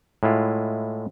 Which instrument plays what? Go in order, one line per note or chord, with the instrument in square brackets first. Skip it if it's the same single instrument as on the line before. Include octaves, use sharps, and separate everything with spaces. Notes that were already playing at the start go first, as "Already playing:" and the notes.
[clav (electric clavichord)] A2 G#3 E4 F4